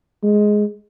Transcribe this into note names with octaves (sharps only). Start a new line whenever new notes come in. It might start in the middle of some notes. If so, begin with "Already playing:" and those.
G#3